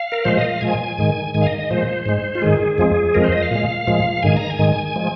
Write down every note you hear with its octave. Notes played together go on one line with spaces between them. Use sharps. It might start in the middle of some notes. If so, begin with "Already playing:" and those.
Already playing: F5
A#4
A#2 F3 G#3 C5
D#5
F5
A#2 F3 G#3 G#5
G#2 D#3 G#3
G#2 D#3 G#3 G#5
F5
D#5
D#5
A#2 F3 G#3 C5
G#2 G#3
F4
G#2 D#3 G#3 G#4
F2 F3 G#3
F2 F3 G#3 A#4
C5
D#5
F5
A#2 G#3
A#2 F3 G#3
G#2 D#3 G#3 G#5
A#5
G#5
G#2 D#3 G#3
F3 G#3